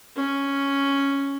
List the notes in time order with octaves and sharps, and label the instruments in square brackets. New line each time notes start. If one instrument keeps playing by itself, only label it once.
[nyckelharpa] C#4